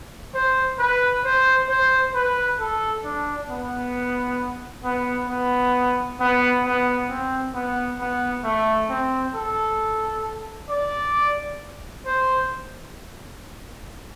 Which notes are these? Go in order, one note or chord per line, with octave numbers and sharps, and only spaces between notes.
C5
B4
C5
C5
B4
A4
D4
B3
B3
B3
B3
B3
C4
B3
B3
A3
C4
A4
D5
C5